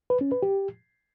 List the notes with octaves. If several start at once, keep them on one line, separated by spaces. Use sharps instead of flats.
B4
C#4
B4
G4